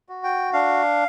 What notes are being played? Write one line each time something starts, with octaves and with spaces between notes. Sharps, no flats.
F#4
G5
D4 F5